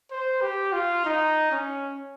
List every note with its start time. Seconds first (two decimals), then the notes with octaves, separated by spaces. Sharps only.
0.11 C5
0.42 G4
0.73 F4
1.05 D#4
1.52 C#4